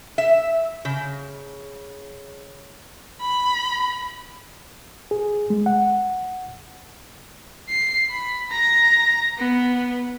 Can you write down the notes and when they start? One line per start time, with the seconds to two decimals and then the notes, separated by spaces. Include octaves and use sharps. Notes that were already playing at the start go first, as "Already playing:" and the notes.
0.18 E5
0.85 C#3
3.21 B5
5.11 G#4
5.50 G#3
5.66 F#5
7.70 C7
8.10 B5
8.51 A#5 A#6
9.39 B3